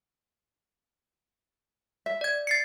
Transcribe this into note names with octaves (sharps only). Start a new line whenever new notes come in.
E5
D5 G#6
A6 C7 C#7